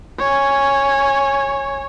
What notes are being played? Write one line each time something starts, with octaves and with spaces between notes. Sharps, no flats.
C#5 G#5